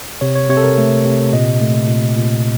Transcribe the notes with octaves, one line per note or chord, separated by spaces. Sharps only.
C3 C#5
C#5
C3 C#5
A4
A#4
A3
C3
A#2 D#5
A3
A#2
A#2